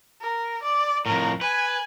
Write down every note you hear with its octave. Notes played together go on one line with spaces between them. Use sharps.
A#4
D5
F2 A2 A#4
B4 G#5